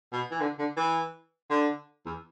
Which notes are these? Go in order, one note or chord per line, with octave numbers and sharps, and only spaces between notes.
B2
E3
D3
D3
E3
D3
E2